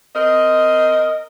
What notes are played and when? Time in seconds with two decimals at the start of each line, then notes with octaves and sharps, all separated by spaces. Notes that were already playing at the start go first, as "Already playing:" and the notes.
0.15 C4 A#4 D#5